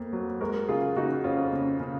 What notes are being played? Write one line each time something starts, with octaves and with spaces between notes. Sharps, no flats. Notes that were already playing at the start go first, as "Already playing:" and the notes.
Already playing: F2 A#3
F#3
G#3 F#4 A#4
C#3 F4 G#4
C#3 D#4 F#4
F2 C#4 F4
C#3
C#3